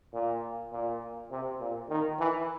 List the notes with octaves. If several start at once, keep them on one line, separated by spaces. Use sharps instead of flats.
A#2
A#2
C3
A#2
D#3
E3